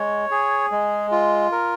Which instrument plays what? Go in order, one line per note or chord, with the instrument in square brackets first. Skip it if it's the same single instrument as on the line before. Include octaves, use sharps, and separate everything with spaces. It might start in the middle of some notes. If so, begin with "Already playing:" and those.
Already playing: [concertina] G#3 C#5
G#4
G#3
F4
A#4